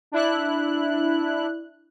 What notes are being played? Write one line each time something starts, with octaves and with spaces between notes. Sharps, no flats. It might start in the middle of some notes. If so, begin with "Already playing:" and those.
D4 E4 F#6